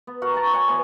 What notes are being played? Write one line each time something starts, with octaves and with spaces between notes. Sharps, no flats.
B3
F#4 A#4 F#5
A5 A#5 C#6
C#5 F#5 G#5
E3 B3 C5 G#5